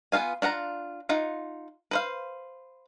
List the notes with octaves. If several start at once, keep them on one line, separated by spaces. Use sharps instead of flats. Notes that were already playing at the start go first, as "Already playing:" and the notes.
B3 F4 F5 G#5
D4 F4 F#5 A#5
D#4 F4 F#5
B4 C5 F5